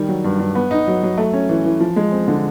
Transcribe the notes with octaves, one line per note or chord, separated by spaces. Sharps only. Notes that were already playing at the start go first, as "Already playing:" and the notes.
Already playing: D#3 G3
F#3
G2
G2
B3
D#4
F#3
F#3
A3
C#4
E3
E3
F3
G#3
C4
D3